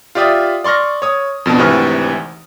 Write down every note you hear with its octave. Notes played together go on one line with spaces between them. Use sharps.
F4 G4 D5 E5 D#6 F6
D5 C6 C#6 F6 A#6
C#5 D#6
F2 B2 B3 D4
G#1 D2 C3 E3 C#6 F6